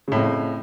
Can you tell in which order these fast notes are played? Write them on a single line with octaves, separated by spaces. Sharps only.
C#3 A2 F2